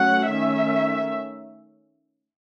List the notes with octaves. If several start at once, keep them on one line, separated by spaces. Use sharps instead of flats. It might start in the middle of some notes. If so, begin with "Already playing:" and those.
Already playing: F#3 A3 C#4 F#5
D#3 A3 C#4 E5